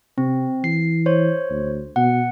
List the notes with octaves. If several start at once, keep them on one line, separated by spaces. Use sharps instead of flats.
C3 C4
E3 C7
C5 C#5
D2
B2 F#5